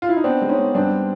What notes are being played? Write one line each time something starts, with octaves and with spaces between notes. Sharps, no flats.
F4
E4
D#4
B3 C4 D4
G#3
C#4 D#4
B3
G2 C4 D4